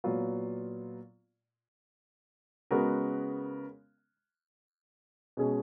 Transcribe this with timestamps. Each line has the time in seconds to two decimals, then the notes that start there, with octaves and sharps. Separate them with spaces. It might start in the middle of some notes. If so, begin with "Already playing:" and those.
0.04 A#2 F#3 B3 F4
2.71 C#3 G#3 B3 F#4 A#4
5.37 B2 G#3 C#4 G#4